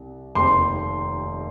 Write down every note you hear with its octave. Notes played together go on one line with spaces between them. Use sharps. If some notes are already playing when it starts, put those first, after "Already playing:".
Already playing: C2 C3
F1 D#2 D#3 C4 C6